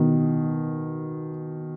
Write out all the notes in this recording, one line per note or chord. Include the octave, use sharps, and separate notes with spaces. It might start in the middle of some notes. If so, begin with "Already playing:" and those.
Already playing: B2 D#3